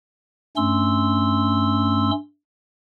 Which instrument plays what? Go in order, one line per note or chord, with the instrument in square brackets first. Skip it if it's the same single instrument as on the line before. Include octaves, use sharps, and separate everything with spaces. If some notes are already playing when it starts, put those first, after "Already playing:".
[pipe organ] G2 A3 C#4 C6 E6